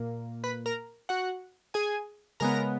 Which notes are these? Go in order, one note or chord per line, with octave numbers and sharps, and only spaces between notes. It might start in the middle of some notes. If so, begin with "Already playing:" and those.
Already playing: A#2 A#3
B4 B5
A#4 A#5
F#4 F#5
G#4 G#5
C#3 G#3 B3 A#4 A#5